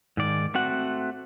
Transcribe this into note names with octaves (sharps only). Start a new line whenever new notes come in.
G#2 D#3 D5
A3 C4 F#4 F#5